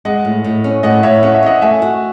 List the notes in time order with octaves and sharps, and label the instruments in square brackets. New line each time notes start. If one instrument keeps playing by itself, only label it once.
[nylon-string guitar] G#3 [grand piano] D#5 F#5
[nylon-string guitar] A2
A2
C#4
[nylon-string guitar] A2 [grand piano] D#5 F#5
[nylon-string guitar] A2 [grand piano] C#5 E5
[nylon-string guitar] C#4 [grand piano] F#5
[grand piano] E5
[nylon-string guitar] C#4 [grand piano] D#5 F#5
[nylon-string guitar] A3 [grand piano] E5 G#5
[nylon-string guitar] F#4